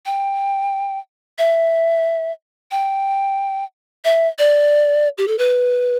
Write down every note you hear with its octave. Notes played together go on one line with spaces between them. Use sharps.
G5
E5
G5
E5
D5
G4
A4
B4